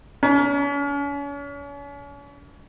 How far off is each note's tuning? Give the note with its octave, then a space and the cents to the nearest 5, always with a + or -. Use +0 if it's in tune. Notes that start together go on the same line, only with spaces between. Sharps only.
C#4 +40